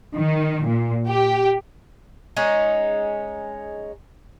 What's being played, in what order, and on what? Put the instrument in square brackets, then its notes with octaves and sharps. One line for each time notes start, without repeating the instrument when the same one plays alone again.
[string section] D#3
A#2
G4
[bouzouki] G#3 C#4 D#4